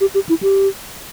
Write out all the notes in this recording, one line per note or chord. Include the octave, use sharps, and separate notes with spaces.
G4
G4
E4
G4